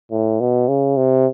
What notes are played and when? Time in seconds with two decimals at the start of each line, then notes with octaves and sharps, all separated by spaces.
0.11 A2
0.40 B2
0.68 C#3
0.97 C3